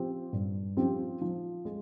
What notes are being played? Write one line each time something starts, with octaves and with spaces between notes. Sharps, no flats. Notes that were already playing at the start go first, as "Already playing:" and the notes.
Already playing: F3 C4 G4
G2
F3 C4 G4
F3
G#3